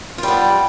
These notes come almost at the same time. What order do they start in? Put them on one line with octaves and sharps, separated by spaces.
F4 G3 B3